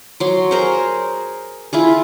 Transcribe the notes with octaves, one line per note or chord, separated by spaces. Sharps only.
F#3 C6
G#4 A#4 C5
E4 F4 G#4